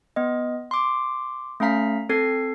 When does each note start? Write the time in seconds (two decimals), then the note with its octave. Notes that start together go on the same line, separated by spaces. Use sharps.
0.16 B3 D#5
0.71 C6 D6
1.60 A3 C#4 F5 A#5 B6
2.09 C4 A4 G#6 C7